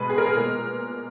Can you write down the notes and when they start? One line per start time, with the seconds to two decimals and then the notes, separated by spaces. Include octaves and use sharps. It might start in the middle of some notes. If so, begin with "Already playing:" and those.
Already playing: B2 G#3 B3 B4
0.10 G#4
0.18 A#4
0.26 G#4
0.37 A#2 G#3 B3 A#4